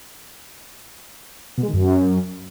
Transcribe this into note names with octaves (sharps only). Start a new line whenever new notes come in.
B2
G#3
D#3
F#2